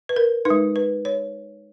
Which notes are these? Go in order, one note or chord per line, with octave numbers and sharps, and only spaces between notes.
B4
A#4
D#4 B4
G#3
B4
C#5